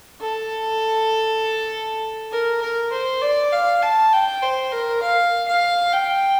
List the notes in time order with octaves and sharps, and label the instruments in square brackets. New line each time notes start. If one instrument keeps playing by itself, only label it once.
[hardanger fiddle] A4
A#4
A#4
C5
D5
F5
A5
G5
C5
A#4
F5
F5
G5